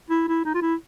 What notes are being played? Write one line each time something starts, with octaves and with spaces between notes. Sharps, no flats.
E4
E4
D#4
F4
E4